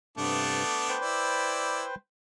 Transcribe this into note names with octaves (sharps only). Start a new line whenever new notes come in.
G2 C3 A3 B3 D4
B4 C5 G5
E4 D5